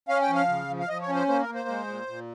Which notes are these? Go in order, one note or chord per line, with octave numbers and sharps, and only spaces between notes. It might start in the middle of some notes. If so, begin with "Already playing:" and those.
C#4 F5
G5
F3
F5
C#3
F3
F5
F3 D#5
C#5
C#4
C5
A#3 C5
A#4
A#3
C5
G#3
A#2
A#2